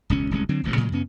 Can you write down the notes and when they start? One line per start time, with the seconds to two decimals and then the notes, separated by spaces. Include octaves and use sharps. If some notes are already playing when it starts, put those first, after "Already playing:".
0.10 E1 C#2 C#4
0.31 D1 C2 G#3 C#4
0.49 D3 F#3 C4
0.64 E1 A1 D#2 F3
0.76 A2 C#3 F#3 G#3
0.92 F#2 C#3 B3 C#4